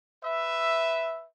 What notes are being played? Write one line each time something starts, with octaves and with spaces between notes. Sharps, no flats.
B4 E5